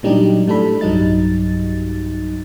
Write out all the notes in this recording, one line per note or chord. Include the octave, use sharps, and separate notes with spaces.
A#2 F#3 G3 D4 D#4 G4
A2 G3 D4 A4 B5
B1 G2 F#3 G3 D#4 A6